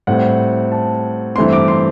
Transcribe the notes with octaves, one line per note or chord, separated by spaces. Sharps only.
A2 G3 C4 F#5
A5
G2 E3 A3 C4 C6
D6
C6